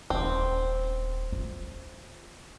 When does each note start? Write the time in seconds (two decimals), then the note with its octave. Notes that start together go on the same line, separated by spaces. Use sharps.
0.10 D#1 C4 C#4
1.32 F4